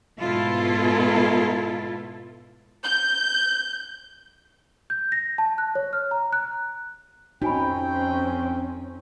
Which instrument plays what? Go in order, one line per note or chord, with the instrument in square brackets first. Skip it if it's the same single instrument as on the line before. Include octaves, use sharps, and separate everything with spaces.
[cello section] G#2 B2 B3 E4 F4 A4
[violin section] G6
[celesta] G6
A#6
A5
F#6
C#5
F6
A#5
F#6
[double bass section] F2 C4 C#4 [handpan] D#4 [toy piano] F#4 G#5 B5 [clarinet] G5